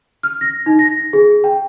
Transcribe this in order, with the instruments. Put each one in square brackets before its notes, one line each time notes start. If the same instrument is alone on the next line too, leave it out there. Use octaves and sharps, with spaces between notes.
[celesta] F6
A#6
D#4
A#6
G#4
G5